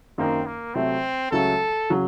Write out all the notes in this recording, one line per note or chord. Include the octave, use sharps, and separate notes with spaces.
F#2 D#3 A#3 C4 D#4
A#3
C3 F#3 A3 C4
C#2 C#3 F#3 A3 A4
C#3 F#3